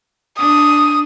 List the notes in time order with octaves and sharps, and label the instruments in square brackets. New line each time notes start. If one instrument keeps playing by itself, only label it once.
[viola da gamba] D4 [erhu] D#6